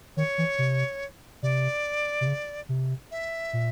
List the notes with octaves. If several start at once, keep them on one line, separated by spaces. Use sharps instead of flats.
D#3 C#5
E3
C3
C3 D5
C3
C#3
C3
E5
A#2